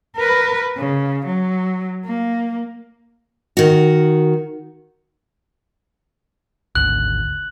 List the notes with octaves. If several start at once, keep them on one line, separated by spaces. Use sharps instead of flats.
A#4 B4
C#3
F#3
A#3
D#3 F#4
G#1 D2 F#6 F#7